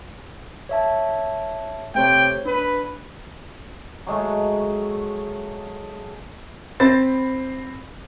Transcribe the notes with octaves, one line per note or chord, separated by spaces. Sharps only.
C#5 E5 A5
C3 A3 C5 C#5 G5
D4 B4
F#3 G#3 A3
C4 C5 B5 A6